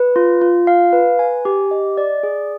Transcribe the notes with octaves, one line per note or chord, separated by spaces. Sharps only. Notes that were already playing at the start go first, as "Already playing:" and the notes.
Already playing: B4
F4
F4
F5
B4
G#5
G4
D#5
D5
G#4